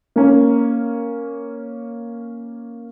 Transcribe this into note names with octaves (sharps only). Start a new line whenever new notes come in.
A#3 C#4